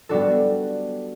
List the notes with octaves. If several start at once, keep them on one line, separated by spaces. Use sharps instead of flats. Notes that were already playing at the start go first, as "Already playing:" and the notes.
G3 B3 D4 F#4 A4